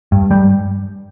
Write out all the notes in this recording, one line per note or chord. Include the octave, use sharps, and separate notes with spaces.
G2
G3